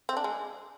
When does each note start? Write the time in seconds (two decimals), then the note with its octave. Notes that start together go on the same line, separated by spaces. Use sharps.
0.09 C4
0.17 D4
0.24 G#3